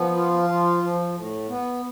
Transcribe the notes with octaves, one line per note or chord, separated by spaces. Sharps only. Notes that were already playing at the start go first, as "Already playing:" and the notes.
Already playing: F3 B3
F4
F3
F3
A2
B3